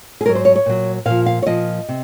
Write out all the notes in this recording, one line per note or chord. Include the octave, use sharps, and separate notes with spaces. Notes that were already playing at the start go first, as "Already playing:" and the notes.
G#4
G#2 F#3 A#4
C5
C#5
C#5
A#2 F#3
A#2 F3 F5
F5
C#5
A#2 F3 D#5
C3